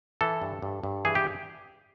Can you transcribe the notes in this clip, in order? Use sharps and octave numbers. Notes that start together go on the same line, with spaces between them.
E3 A4
G2
G2
G2
E3 G#4
G4